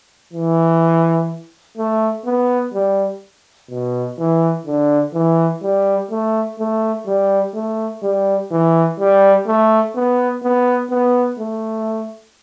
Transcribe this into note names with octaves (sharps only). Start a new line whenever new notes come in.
E3
A3
B3
G3
B2
E3
D3
E3
G3
A3
A3
G3
A3
G3
E3
G3
A3
B3
B3
B3
A3